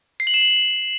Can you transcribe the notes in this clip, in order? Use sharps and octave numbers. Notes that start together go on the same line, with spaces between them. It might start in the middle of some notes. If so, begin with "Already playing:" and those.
C7
F#7
E7
F#7